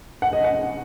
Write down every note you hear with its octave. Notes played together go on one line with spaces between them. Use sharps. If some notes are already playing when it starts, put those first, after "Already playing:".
F#5
D#5
F#5